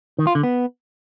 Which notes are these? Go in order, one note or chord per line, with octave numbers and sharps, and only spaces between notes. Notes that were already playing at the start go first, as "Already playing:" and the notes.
D#3
F4
D3
B3